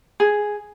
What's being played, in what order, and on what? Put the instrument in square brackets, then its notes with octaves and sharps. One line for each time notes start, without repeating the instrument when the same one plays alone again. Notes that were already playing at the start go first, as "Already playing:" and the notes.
[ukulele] G#4